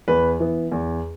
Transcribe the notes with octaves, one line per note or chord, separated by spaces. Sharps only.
E2 B4
E3 B3
E2